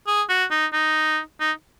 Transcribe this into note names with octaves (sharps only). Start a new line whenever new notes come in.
G#4
F#4
D#4
D#4
D#4